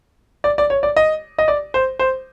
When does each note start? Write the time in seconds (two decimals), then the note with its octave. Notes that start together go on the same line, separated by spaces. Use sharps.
0.44 D5
0.58 D5
0.70 C#5
0.83 D5
0.96 D#5
1.38 D#5
1.48 D5
1.74 C5
1.99 C5